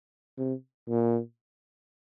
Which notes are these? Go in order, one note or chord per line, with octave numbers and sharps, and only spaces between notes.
C3
A#2